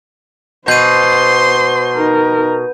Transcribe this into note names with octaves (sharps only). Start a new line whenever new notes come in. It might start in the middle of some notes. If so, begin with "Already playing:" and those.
B2 C5 C6 G6 D#7
D#4 A#4